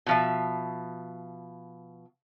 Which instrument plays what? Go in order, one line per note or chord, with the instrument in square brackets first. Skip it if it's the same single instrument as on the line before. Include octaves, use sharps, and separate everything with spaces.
[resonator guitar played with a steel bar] B2 F3 E5